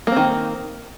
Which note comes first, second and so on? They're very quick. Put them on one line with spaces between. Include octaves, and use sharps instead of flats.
A#3 C4 D#3